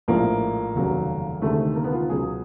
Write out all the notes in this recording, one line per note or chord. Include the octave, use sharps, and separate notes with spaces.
A#1 A2 F3 G#3 A#3
F1 D#2 C#3 F#3
D2 C3 D#3 G#3 A3
A#3
B3
F4
C#2 B2 F#3 G#4